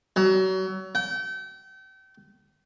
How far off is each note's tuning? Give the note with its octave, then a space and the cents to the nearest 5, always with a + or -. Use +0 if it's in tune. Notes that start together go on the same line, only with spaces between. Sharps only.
F#3 +30
G5 -35